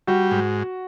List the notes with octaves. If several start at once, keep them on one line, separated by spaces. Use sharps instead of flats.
G3 F#4
G#2